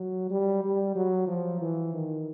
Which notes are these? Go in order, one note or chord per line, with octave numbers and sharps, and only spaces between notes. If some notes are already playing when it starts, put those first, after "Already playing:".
Already playing: F#3
G3
G3
F#3
F3
E3
D#3